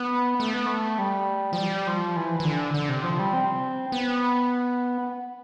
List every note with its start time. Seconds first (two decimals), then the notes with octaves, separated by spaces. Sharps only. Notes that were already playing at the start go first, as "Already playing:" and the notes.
Already playing: B3
0.40 A3
0.54 B3
0.66 A3
0.98 G3
1.53 F3
1.58 G3
1.87 F3
2.16 E3
2.40 E3
2.45 D3
2.74 D3
2.89 C3
3.04 F3
3.19 G3
3.33 C4
3.92 B3